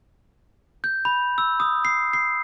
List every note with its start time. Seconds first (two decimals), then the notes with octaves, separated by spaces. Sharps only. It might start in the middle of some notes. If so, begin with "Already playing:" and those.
0.84 G6
1.05 B5
1.38 E6
1.60 D#6
1.85 C7
2.13 C7